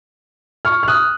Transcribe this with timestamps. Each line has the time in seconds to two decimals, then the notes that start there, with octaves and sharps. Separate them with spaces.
0.65 C#6 F6
0.83 F6
0.88 D#6 F#6